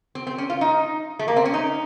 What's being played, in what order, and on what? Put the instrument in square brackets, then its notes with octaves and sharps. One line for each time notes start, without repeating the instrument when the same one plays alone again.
[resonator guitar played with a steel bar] C4
C4
C#4
F4
D#4
A3
A#3
C4
C#4
D#4